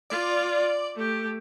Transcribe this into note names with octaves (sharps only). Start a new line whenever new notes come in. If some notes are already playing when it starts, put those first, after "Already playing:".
F4 D5
A3 G4